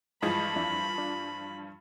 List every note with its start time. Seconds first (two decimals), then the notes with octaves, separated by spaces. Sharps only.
0.22 G2 E3 F3 G#3 D#5 B5
0.56 F2 D4 E4
0.98 D4